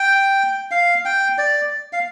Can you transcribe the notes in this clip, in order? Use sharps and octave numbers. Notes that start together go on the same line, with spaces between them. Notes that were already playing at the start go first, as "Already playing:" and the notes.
Already playing: G5
F5
G5
D5
F5